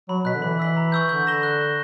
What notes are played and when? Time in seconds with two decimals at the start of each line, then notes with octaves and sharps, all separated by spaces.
0.09 F#3 B5
0.25 B2 F#6 B6
0.34 D3
0.42 E3 B5
0.59 E6 B6 F#7
0.77 A#5
0.92 C#6 E6 G6
1.09 D3 G6
1.27 A#6 E7 G7
1.43 F#6
1.60 A#6 E7